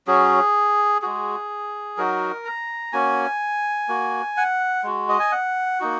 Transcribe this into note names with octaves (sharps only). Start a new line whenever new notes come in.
F#3 C#4 F#4 G#4
G#3 F#4 G#4
F#3 D#4 F#4 A#4
A#5
A#3 C#4 F#4 G#5
A#3 F#4
F#5
G#3 F#4
D#5
G#5
F#5
A#3 D#4 F#4